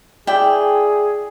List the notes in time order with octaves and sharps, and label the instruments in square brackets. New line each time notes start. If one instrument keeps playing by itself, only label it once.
[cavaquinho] E4 D5 G5 [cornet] G#4